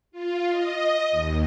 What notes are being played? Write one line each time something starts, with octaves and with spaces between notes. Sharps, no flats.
F4
D#5
D#2